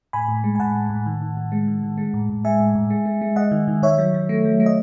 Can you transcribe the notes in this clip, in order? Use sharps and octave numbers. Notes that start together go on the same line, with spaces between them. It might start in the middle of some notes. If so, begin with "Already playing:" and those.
A2 G#5 B5
A2
G#3
G#5
A2 F#5 A5
A2
A2
D#3
D#3
D#3
G#3
D#3
D#3
G#3
A2
A2
G#3 E5 G#5
A2
A2
G#3
G#3
G#3
G#3 D#5 F#5
D#3
D#3
D#3 C#5 E5
F#3
F#3
A3
F#3
A3
D#5